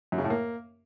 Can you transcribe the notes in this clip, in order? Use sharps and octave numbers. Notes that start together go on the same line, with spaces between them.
F#2
C#3
A2
A#3